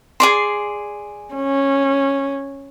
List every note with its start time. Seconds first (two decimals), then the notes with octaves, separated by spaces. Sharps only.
0.20 G#4 D5 C6
1.36 C#4